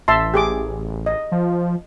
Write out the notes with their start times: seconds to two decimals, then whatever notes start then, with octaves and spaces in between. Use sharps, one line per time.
0.08 A1 E5 A5 C6
0.34 G4 G#4 D6
1.06 D#5
1.32 F3